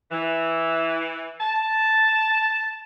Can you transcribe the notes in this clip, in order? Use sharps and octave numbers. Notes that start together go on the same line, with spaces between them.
E3
A5